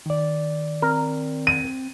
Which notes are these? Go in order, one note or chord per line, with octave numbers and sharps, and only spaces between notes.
D#3 D5
C4 A#4
D#7